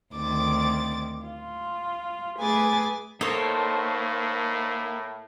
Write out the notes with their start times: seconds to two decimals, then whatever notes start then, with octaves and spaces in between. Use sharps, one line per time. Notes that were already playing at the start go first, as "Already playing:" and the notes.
0.15 D2 D#3 C4 D6 A6
1.24 F4
2.38 A3 G#4 B4 G#5 D6 A6
3.21 A2 A#3 D#4 A4 C5 C#5 D#5